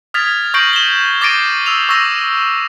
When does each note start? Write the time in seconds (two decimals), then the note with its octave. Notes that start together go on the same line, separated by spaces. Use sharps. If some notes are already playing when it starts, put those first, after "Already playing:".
0.14 D#6 F6 G#6 A6 B6 F7
0.54 C#6 G6 A#6 C7 D7 F#7
0.73 E7 G7
1.21 D6 A6 A#6 C7 D7 D#7
1.66 D#6 E6 E7 F7
1.89 C#6 E6 A6 A#6 E7